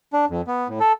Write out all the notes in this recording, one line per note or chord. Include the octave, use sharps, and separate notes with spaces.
D4
F2
B3
A2
A4